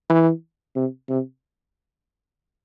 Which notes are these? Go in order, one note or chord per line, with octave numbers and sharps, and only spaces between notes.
E3
C3
C3